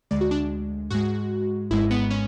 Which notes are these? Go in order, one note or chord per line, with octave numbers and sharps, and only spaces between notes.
D2 D3 G#3 D5
F#4
D4
G#2 G#3 F#4
G#1 G#2 G#3 E4
B3
C#4